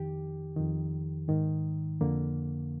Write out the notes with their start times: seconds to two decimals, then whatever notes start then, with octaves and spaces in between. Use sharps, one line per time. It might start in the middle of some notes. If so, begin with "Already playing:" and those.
Already playing: F2 D#3 G4
0.56 F2 D#3
1.28 G#2 D#3
2.00 F2 D3 A#3